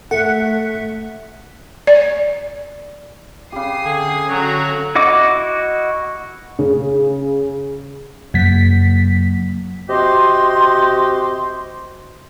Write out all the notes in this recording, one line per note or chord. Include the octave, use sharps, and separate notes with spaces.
A3 A4 E5 F#5
D5
C#3 G4 D#6 C7
D3 G#4
D3 F#3 C#4 F#4 A#5
E4 F#4 D#5 D6
C#3
F#2 C#3 F#3 A#3 B6
C3 F#4 G4 D#5 C6